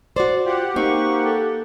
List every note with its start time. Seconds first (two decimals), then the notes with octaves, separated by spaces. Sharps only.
0.16 F#4 C5 D5
0.45 F4 G4 F#5
0.76 A#3 C4 D#4 C#6
1.24 A4